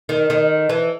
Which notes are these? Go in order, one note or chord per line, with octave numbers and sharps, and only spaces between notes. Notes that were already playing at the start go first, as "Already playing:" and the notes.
D#3
D#3
E3